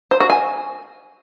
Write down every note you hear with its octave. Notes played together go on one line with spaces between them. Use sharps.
C5
F#4
G#5